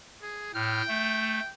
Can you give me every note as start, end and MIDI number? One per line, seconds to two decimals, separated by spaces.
0.22 0.50 68
0.55 0.82 45
0.55 1.52 79
0.55 0.82 89
0.88 1.39 57